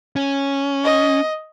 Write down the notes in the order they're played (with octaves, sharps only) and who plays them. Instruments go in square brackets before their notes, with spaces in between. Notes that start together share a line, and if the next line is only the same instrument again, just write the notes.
[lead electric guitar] C#4
[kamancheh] D#5